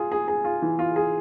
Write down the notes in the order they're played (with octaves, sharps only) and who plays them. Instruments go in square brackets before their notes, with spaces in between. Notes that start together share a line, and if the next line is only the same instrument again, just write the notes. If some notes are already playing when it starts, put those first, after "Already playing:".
Already playing: [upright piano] F4 G#4
G#4
G#4
F4
E3
F4
G#4